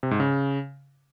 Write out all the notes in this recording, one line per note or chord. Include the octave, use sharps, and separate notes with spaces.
C3
G#2
C#3